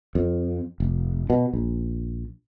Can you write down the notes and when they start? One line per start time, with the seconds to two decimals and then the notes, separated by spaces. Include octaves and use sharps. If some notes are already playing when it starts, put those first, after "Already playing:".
0.15 F2
0.80 F1
1.30 B2
1.53 A#1